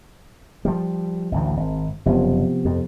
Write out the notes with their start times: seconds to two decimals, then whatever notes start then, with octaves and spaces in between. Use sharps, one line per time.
0.65 F3 G3
1.32 A1 D2 A2
1.57 G#1
2.06 F#1 C3 F3 B3
2.65 F2